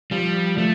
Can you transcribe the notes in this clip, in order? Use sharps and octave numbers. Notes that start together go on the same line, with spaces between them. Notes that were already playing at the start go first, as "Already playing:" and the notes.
F3 G3
F3 A3